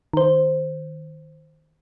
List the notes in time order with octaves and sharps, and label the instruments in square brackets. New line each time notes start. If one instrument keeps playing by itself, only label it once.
[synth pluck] D#3 C5